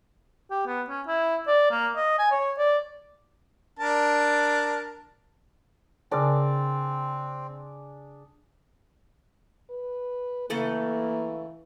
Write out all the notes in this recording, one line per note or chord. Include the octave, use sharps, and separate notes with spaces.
G4
B3
C#4
E4
D5
A#3
D#5
G#5
C#5
D5
D4 A#4 A5
C#3 C4 D4 G#4 A#4 D5
B4
C#3 E3 A3 A#3 A4